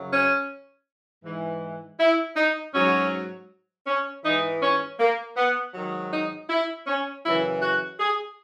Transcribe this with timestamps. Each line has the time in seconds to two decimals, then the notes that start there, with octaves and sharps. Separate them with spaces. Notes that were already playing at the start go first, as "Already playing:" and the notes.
Already playing: F#2 C#3 F#3
0.12 C#4
1.24 G#2 E3
1.99 E4
2.36 D#4
2.74 G#2 F#3 C#4
3.87 C#4
4.24 G#2 E3 D#4
4.62 C#4
4.99 A#3
5.37 B3
5.74 G#2 D#3 F#3
6.11 D#4
6.50 E4
6.87 C#4
7.24 F#2 C#3 E3 E4
7.61 F#4
8.00 G#4